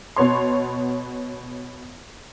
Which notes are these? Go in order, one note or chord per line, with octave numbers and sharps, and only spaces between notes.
B2 B3 C#5 C6